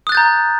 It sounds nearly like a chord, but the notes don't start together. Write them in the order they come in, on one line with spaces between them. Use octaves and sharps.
D#6 F#6 A6 G6 A#5